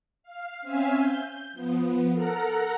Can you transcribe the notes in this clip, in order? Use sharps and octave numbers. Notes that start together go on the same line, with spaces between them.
F5
C4 C#4 E5 F5 G#5
G6
F3 B3
A4 A#4 F#5 A#5